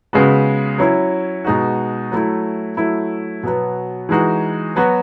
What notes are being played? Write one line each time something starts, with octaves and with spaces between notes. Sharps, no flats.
C#3 G#3 B3 F#4
F#3 C#4 E4
B2 G#3 D#4 F#4
F#3 A3 E4
F#3 A3 E4
B2 F#3 B3
E3 G#3 D#4 F#4
F#3 B3 F#4